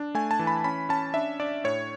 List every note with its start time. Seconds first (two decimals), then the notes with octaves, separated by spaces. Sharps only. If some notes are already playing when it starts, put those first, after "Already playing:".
Already playing: D4
0.15 A3 G#5
0.31 A5
0.39 E3
0.47 B5
0.64 C#4 B5
0.89 C#4 A5
1.14 D4 E5
1.40 D4 D5
1.64 A2 C#5